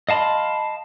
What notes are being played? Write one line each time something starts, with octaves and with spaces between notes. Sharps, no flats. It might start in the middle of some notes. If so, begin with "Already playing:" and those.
D#5 F5 A5 B5 C6